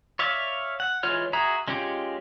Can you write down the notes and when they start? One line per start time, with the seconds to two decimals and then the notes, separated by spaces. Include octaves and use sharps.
0.19 C#5 D5 E5 F5
0.80 F#5
1.03 E3 G#3 F4 C#5 F6
1.33 F#4 G#4 E5 A#5
1.68 G#3 C#4 F4 G4